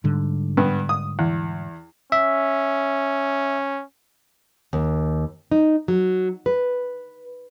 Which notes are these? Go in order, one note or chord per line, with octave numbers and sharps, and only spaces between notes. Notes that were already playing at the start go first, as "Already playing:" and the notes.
G#2 D3 G3
G2 B3
D#6
E2
C#4 E5
D#2
D#4
F#3
B4